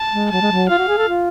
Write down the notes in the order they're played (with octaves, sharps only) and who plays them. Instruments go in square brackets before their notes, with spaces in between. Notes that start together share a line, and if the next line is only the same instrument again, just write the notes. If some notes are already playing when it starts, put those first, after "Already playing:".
Already playing: [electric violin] A5
[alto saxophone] G#3
[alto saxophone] F#3 [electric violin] A5
[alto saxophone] G#3
F#3
[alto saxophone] F4 [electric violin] F5
[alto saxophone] F#4
G#4
A4
F4